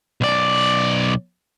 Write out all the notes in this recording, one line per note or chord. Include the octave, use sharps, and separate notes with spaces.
B1 D5